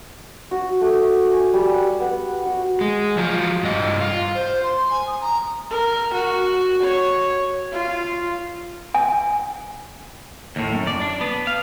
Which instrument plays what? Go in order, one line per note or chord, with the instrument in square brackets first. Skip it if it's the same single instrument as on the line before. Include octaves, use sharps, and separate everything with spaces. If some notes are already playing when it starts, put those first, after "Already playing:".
[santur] F#4
A3
G#5
G3
F#5
B3
F#4
[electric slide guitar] G#3
F3 F#3 F4
G2 D#5
F4
[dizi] C5
C6
G#5
D#6
A#5
[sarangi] A#4
F#4
C#5
F4
[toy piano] G#5
[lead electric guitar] D#2 A2
F#2
D5
D4
B3
F5